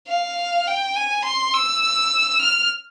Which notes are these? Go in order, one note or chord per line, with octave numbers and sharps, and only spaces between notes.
F5
G5
G#5
C6
E6
F6